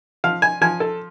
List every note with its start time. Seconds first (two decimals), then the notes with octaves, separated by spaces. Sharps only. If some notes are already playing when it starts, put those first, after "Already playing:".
0.24 F3 F5
0.42 G#5
0.61 F3 G#5
0.80 A4